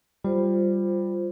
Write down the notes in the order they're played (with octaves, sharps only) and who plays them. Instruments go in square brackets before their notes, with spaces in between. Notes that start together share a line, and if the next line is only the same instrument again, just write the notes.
[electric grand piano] G3 [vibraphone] F4 C5